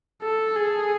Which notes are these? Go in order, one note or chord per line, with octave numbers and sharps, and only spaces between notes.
A4
G#4